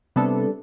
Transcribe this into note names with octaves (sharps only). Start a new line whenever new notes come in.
C3 G3 B3 D4 A4